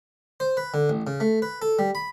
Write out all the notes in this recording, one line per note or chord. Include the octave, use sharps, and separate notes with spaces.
C5
B4
D3
A1
C#3
A3
B4
A4
G3
B5